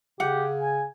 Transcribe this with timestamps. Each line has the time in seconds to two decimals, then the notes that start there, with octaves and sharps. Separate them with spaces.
0.20 C#3 G4 F#5
0.61 G#5